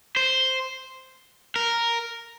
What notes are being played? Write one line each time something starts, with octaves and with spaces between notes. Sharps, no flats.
C5
A#4